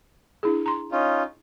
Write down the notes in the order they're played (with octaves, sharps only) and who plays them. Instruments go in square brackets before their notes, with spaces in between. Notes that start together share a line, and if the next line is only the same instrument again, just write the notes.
[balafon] D4 E4 G#4
A#5 C6
[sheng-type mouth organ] C#4 D#4 F4